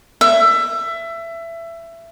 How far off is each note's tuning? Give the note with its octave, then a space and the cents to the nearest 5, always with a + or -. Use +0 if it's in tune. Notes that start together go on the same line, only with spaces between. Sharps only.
E5 +20